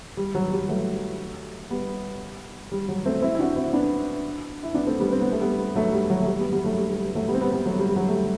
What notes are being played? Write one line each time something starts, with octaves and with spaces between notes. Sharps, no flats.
G3
F#3
G3
F#3 A3
G3 B3
G3
F#3
A3 C4
C4 E4
E4
D4 F#4
C4 E4
B3 D4
E4
B3 D4
A3 C4
G3 B3
C4
B3
A3
G3 B3
F#3 A3
G3
F#3
A3
G3
G3 B3
G3 B3
F#3 A3
G3
G3
G3
F#3 A3
G3 B3
C4
G3 B3
G3 B3
F#3 A3
G3
G3
F#3
A3
G3